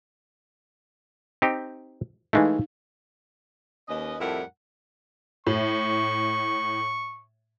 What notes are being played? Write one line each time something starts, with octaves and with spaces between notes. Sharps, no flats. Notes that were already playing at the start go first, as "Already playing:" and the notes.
C4 D#4 G4
E3 G#3 A3 D#4 F5
D#2 C#4 B4 D#5
F2 A2 G3 E4 A#4 F#5
A2 C#6